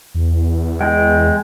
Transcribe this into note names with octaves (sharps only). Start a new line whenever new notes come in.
E2
G#3 G5